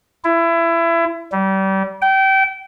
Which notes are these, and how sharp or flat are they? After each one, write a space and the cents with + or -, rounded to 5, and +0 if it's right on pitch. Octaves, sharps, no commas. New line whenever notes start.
E4 +25
G3 -30
G5 -25